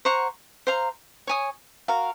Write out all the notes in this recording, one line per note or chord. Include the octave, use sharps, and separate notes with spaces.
C5 F#5 A#5 C#6
C5 F5 A#5
C#5 G#5 D#6
F#4 A#4 F5